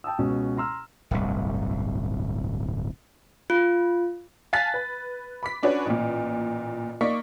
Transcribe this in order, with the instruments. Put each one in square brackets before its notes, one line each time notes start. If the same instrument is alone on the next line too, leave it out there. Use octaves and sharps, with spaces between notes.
[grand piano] G5 A5 D#6 E6
C#2 B2 C#4
A#5 C6 E6 F6
[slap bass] D1 G1 C2
[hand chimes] F4
[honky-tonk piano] F5 G#5 A5 F#6 A6 B6
B4
B5 D6 B6
C#4 D4 F#4 B4 C#5
A1 A#2
A#3 D#4 D5 C#6 B6